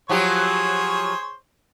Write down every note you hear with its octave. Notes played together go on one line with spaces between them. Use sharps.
F3 F#3 G4 G#4 C5 C#5